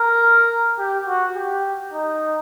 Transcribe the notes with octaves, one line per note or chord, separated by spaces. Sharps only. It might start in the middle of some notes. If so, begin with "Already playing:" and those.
Already playing: A#4
G4
F#4
G4
D#4